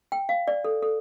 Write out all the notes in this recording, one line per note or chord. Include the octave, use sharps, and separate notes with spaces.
G5
F5
D5
A4
A4